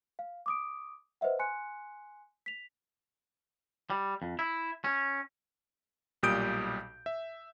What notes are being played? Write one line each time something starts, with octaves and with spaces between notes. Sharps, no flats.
F5
D6 D#6 D7
B4 C5 D#5 E5 F#5
G#5 C6 F#6 C#7
B6 F7
G3
F2
E4
C#4
B1 A#2 G3 D#6 G6 D7
E5